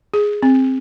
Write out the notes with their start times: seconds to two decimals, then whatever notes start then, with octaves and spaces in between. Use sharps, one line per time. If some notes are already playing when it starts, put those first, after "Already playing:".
0.14 G#4
0.42 C4